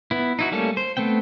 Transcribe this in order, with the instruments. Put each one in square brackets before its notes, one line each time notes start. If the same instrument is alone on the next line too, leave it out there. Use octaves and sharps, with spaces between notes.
[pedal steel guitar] B3 E4
D#4 E4 F#4
G3 A3 A#3 C#4 A4
C5
A3 B3 C4 G5